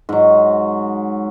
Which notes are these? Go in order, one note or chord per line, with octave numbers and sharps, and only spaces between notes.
G#2 F#3